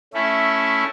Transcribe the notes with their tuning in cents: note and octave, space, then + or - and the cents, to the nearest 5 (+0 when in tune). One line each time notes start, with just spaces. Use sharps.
A3 +0 C#4 +0 E4 +0